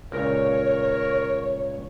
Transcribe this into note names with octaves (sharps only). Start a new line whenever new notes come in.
C#2 A#2 C#4 A#4 C#5